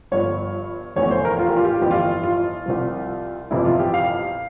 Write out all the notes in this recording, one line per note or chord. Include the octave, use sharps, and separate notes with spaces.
G1 G2 F3 C#5
F1 E2 E3 C#5
C5
A#4
F4
G4
F4
G4
F4
G1 F2 E3 G4
F4
F4
C2 C3 F3
G1 F2 C3 E3 E4
F4
G4
F5